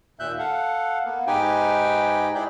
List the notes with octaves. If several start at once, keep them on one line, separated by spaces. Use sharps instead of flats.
D#2 A#2 E5 F#6 G6
A4 F5 F#5
A#3 B3
G#2 D#4 G4 B4 G5 G#5
E4 G4 G#4 D5 G5